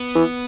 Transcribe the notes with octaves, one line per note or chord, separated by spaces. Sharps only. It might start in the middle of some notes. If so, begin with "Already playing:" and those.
Already playing: B3
E3